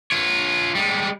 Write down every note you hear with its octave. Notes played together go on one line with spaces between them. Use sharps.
F4 C#5
G3 G#3